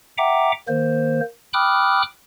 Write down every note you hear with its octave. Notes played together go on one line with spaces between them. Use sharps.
E5 F#5 G5 A#5 D6
D#3 A#3 C5
G5 B5 D6 D#6 F6 F#6